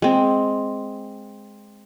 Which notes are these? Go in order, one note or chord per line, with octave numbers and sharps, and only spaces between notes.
G#3 C4